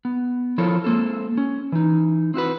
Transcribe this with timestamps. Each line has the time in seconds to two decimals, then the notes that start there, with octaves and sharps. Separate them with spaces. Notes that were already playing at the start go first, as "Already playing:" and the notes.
0.05 B3
0.58 F3 E4 F4 A4 A#4 C#5
0.84 G#3 A#3 C4 A4
1.38 C#4
1.72 E3 D#4
2.34 C4 E4 F#4 B4